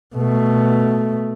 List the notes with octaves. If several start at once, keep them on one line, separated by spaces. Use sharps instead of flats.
B2 A3